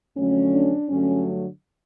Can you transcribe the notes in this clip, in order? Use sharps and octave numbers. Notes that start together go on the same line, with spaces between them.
F2 D3 F#3 A3 C#4
D4
G2 D3 F#3 A3 C#4